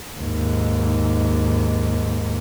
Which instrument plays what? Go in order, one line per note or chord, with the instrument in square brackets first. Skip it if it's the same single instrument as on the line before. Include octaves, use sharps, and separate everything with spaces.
[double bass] D#2 G#2